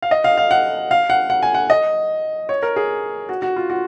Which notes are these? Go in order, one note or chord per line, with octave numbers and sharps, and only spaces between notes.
F5
D#5
F5
F5
F#5
F5
F#5
F#5
G#5
F#5
D#5
C#5
A#4
G#4
F#4
F#4
F4
F#4